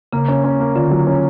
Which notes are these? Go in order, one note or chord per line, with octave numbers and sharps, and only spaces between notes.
C#3 A#3
C#4
C#4
A#3
D3 F4
F#3
C#4